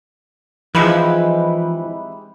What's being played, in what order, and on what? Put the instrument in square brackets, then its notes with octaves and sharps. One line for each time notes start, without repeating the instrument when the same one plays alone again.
[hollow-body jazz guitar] E3 [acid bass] F3 [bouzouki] G#3 D#4 G4 [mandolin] C4 E4 B4